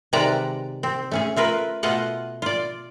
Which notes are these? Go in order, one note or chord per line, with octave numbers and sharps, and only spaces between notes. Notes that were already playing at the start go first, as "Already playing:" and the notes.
C3 D#3 G#3 B4 D5 A#5
C4
A3 C#4 G#4
A3 F4 A#4 B4
B2 A3 F4 D#5 F#5
F4 D5